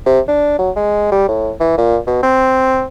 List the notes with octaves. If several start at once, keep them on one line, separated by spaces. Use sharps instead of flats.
C3
D4
F#3
G#3
G3
A2
E3
A#2
B2
C4